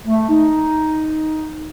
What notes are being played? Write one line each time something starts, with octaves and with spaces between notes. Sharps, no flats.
A3
D#4